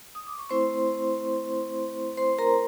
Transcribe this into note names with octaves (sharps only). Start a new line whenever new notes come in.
D#6
D6
C#6
A3 C4 E4 C5 C6
C5 C6
A#4 A#5